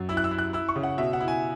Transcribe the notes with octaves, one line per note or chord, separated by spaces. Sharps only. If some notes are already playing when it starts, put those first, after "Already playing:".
Already playing: F#2
E4 E6
F#6
E6
E4
F#6
E4 E6
C#6
C#3
F#5
B2 E5
F#5
E4
G#5